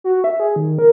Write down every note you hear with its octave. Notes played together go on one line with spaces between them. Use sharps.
F#4
E5
G#4
D#3
A#4